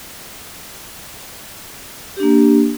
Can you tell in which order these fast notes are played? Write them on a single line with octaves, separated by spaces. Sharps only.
G4 D4 A#3